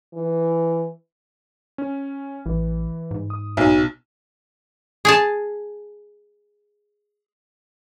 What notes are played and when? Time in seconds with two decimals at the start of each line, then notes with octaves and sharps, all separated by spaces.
0.13 E3
1.78 C#4
2.46 A1 E3
3.11 G#2
3.30 D#6
3.57 B1
5.05 G#4 G#5 A5